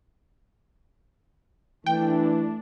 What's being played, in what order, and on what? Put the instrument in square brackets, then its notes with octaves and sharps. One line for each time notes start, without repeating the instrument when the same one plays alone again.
[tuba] E3 [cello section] A3 D4 [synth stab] G5